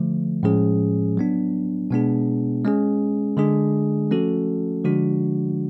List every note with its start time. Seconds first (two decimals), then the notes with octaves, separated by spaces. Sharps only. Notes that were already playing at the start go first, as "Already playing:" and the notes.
Already playing: D3 F3 A3
0.43 A2 F3 G#3 C#4 G#4
1.17 F#3 B3 D4
1.91 B2 G#3 B3 D4 G#4
2.64 G#3 C#4 G#4
3.37 D3 G#3 D4 G#4
4.11 F3 A3 C#4 F#4 A4
4.85 D3 F3 G#3 D4 F#4